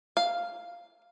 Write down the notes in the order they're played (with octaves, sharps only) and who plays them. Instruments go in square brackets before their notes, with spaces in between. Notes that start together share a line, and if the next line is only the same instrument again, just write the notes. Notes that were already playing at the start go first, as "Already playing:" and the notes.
[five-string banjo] F5